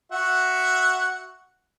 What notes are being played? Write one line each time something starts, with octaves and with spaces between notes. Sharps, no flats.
F#4 E5 F#5